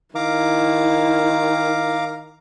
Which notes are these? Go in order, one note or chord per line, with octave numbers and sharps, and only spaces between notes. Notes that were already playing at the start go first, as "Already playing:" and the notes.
D#3 E4 F5 A#5 D6